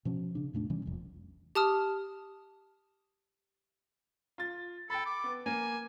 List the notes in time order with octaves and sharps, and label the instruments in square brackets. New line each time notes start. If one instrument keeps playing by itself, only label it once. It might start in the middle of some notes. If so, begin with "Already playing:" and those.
[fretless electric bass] B2 F3 C#4
C#3 D4
F2 A#2 A3 D4
C3 E3 G3 C#4
E1 A#1 F2
[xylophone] G4 A5 D#6 F6
[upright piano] F4 A6
[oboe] A4 [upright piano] G5 B5
[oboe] D6
[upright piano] B3
[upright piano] A#3 [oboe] G#5